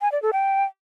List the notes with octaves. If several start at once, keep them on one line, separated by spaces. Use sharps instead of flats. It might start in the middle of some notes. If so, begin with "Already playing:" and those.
G#5
D5
A4
G5